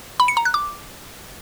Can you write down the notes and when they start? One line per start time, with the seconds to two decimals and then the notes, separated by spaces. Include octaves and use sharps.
0.20 B5
0.28 C#7
0.37 A#5
0.45 F#6
0.54 D6